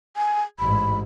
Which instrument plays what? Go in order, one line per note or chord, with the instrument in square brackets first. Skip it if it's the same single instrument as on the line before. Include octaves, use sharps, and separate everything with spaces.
[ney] G#5
[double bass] A1 G#2 [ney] B5